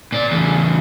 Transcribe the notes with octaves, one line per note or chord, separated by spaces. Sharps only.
A#2 D5
E2 C#3